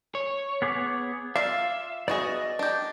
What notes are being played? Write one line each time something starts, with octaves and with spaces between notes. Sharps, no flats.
C#5
B3 G#4 D6
F4 D5 E5 F5
B3 F#4 G#4 D5 D#5
D4 G4